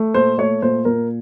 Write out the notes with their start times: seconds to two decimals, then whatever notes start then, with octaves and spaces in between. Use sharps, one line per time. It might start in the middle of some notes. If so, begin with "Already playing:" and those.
Already playing: A3
0.14 A#2 C5
0.38 A3 C#5
0.62 A#2 C5
0.85 A#2 A#4